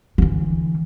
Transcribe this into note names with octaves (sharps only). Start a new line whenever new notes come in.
D3 E3